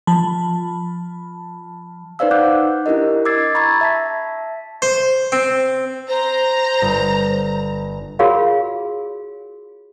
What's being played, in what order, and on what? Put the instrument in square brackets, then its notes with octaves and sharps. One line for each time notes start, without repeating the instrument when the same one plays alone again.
[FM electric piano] F3 A5 B5
[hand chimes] D#4 B4 C5 D5 F5 E6
D#4 F#5 D6 F#6 G6
D4 E4 G4 A#4 D#5
D6 E6 G#6 A6 C7
A#5 B5 C#6 E6 G#6 A6
E5 A5 B6
[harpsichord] C5
C4
[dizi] C5 [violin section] A#5
[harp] G1
[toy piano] F4 F#4 G#4 A#4 C#5 F5